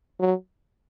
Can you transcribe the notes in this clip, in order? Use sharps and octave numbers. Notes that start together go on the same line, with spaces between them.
F#3